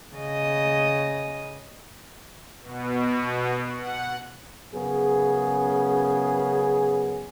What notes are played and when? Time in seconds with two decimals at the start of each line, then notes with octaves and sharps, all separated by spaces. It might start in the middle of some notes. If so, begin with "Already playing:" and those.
0.15 C#3 D#5
2.62 B2
3.75 F#5
4.73 F#2 C#3 B3 G#4